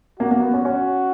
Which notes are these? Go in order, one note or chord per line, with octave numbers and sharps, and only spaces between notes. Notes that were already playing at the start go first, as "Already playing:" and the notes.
A#3 F#4
A#3
B3
C#4
C#4 F#4